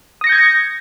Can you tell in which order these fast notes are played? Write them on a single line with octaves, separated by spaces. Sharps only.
D#6 A#6 C#7 G6 G#6